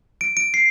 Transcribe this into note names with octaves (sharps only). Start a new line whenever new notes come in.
D7
D7
C7